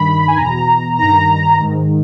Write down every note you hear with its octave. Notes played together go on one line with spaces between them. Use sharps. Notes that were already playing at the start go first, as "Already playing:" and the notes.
Already playing: G2 D#3 B5
G#5
E2 B2 A#5
G2 D#3 A#5
G#2 D#3